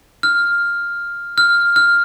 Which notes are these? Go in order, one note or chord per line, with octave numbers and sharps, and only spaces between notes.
F6
F6
F6